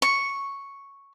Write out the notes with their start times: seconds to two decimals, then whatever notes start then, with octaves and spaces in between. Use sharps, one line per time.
0.02 C#6